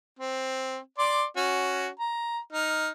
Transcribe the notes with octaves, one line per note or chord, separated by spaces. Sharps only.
C4
D5 C6 D6
C#4 F#4
A#5
D#4 F6